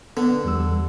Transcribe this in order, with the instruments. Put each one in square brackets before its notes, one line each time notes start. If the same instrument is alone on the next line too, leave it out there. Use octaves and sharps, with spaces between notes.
[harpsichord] D3 [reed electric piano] B3
[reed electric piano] E2 G3 E6